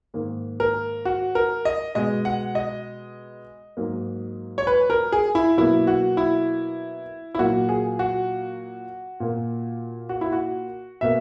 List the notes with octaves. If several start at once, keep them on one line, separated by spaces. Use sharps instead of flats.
G#2 D#3 A#3
A#4
F#4
A#4
D#5
B2 G#3 D#5
F#5
D#5
G#2 F#3 A#3
C#5
B4
A#4
G#4
E4
B2 F#3 A#3 E4
F#4
E4
E4
A#2 F#3 A#3 F#4
G#4
F#4
A#2 A#3
F#4
E4
F#4
B2 A#3 E5